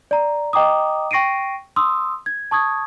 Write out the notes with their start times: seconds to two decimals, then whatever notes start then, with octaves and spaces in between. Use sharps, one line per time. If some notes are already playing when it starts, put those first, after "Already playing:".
0.11 D5 A#5
0.53 D#5 G5 A#5 D6 D#6
1.11 G5 C#6 A#6 C7 D7 D#7
1.76 C6 D#6 E6
2.26 G#6
2.51 A5 C#6 D#6 G#6